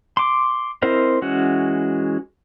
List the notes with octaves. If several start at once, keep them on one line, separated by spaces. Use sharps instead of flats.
C6 D6
C4 E4 A#4 C5 D#5
E3 G#3 C#4 F#4